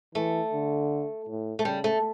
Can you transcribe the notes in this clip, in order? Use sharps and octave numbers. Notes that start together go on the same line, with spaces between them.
E3 A3
D3
A2
A3
C#3 G3
A3